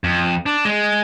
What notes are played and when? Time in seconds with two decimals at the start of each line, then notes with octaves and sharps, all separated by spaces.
0.04 F2
0.46 D4
0.65 G#3